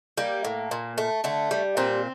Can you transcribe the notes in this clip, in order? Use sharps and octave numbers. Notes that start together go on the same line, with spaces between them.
G3 A#3
A2
A#2
A3
D3 A3
G3
A#2 C4